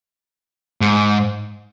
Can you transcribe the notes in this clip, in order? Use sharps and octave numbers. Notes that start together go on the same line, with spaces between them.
G#2